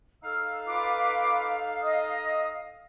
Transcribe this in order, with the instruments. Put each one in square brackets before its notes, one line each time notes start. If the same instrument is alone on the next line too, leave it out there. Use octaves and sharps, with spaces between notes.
[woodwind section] D#4 A4 F5 [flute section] E6 F6
[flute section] F4 B4 D6
D#5 D#6